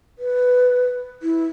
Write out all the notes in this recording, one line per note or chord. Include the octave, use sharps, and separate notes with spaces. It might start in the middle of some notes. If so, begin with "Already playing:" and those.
B4
E4